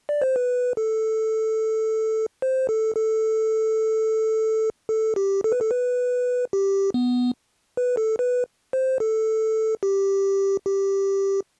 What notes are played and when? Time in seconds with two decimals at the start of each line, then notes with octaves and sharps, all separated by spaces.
0.09 D5
0.22 C5
0.36 B4
0.77 A4
2.42 C5
2.69 A4
2.96 A4
4.89 A4
5.16 G4
5.44 A4
5.52 B4
5.61 A4
5.71 B4
6.53 G4
6.94 B3
7.77 B4
7.97 A4
8.19 B4
8.73 C5
9.00 A4
9.83 G4
10.66 G4